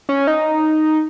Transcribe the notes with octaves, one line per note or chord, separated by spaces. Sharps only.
C#4
D#4